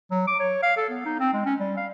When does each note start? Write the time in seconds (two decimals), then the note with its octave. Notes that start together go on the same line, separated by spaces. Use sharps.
0.11 F#3
0.28 D6
0.40 C#5
0.63 F5
0.77 A4
0.90 B3
1.06 D#4
1.20 C4
1.33 G#3
1.46 C#4
1.60 G3
1.77 F5